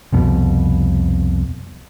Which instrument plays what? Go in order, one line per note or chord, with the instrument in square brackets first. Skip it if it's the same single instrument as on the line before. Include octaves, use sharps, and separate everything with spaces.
[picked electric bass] C2 F2 B2